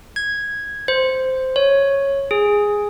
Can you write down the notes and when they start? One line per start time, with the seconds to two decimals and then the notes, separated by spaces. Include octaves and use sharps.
0.16 G#6
0.88 C5
1.56 C#5
2.31 G#4